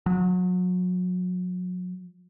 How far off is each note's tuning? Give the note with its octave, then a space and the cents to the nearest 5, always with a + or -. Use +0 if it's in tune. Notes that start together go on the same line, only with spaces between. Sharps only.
F#3 -35